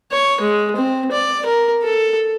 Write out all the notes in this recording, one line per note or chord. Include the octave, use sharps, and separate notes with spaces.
C#5
G#3
C4
D5
A#4
A4